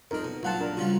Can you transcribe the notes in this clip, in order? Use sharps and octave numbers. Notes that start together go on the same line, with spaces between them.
F2 D4 D#4 A#4
B2
A#1 F#3 F4 F5 F#5 A5
D4 A#4
C#3 F3 G3 F4 F#4